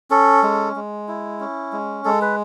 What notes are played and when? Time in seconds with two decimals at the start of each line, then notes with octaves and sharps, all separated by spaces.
0.10 C#4 A4
0.43 G#3
0.76 G#3
1.08 E4
1.40 C#4
1.73 G#3
2.05 G#3 A4
2.21 B4